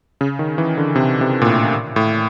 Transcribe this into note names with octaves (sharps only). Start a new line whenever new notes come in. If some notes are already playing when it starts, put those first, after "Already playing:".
C#3
D#3
E3
D3
C3
C3
A#2
A2
A2